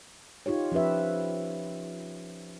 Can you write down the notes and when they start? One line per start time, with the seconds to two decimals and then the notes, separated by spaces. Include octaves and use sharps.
0.46 D#4 F4 G4 C#5
0.72 F3 C#4 G4 B4 E5